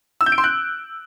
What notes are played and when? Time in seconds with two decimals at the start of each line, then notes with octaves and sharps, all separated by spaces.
0.21 E6
0.26 G6
0.32 D7
0.38 C6
0.44 F#6